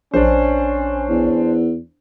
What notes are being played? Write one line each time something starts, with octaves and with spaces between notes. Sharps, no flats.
A#1 C#4 D4 C5
E2